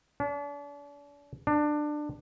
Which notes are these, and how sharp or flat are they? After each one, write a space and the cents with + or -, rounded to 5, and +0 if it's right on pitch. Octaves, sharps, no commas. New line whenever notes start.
D4 -40
D4 +20